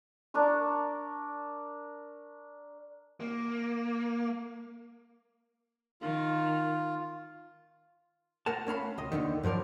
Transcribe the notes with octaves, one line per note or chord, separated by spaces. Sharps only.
D4 A#4 A#5 C#6
A#3
D#3 F4
A#4 F#5 A5
A3 C#4 F5 B5
C#2 D#5
D#2 B2 D3 D#3
G2 F3 F#3 A#4 D5